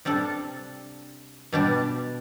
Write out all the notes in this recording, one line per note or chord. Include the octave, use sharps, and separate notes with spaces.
C3 G3 D4 A4
B2 G3 D4